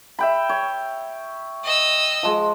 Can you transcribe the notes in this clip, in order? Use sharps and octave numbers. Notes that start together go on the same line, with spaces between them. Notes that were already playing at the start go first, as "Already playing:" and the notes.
E5 G5 B5
C#5
D#5 E6
F3 G#3